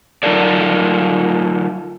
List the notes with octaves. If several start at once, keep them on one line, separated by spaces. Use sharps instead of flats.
F#3 D#4 F4 A4 A#4 D5